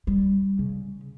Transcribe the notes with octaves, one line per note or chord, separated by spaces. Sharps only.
G3
C#3